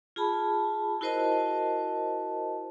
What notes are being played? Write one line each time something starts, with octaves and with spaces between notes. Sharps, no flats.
F4 G#4 A5 B5
E4 F#4 A#4 C5 D#5 A5